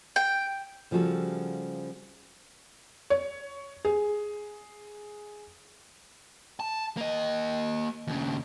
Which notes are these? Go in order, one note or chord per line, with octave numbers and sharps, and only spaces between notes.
G5
C#3 F3 G3 F#4 A4
C#5
G#4
A5
A#3 D#5
D#2 C#3